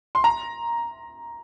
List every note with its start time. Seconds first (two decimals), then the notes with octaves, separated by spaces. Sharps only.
0.15 C6
0.24 A#5